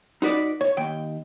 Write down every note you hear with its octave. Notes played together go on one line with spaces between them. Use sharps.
D#4 F#4 B4 D5
C#5
D#2 G5